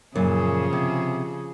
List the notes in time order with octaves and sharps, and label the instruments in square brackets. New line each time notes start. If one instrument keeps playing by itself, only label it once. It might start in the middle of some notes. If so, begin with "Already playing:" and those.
[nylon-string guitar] F#2 A#2 [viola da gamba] C#3 F3 G#4
[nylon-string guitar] C3